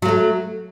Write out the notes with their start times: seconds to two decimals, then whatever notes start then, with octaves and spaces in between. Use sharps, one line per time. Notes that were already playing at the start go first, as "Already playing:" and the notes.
0.02 F#3
0.05 A#3
0.08 A3